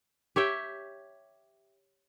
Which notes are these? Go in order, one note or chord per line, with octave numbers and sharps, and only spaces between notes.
G4 C#5 E5 G5